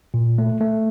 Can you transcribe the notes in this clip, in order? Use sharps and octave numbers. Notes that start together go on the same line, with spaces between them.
A#2
A3
A3